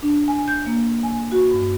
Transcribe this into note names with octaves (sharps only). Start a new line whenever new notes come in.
D4
G#5
G6
A#3
G#5
F#4
G2